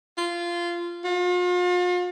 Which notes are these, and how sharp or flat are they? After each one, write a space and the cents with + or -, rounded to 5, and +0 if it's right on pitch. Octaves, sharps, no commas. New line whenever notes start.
F4 -15
F4 +40